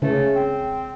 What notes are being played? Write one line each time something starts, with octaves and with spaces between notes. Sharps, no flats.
C#3 A3
C4